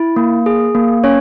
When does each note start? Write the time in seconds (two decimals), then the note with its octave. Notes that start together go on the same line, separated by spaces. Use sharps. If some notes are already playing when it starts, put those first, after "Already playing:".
Already playing: E4
0.16 A#3
0.46 G#4
0.75 A#3
1.04 C#4 C#5